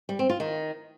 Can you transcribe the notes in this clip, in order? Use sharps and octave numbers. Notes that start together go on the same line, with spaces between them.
G3
C4
F4
D#3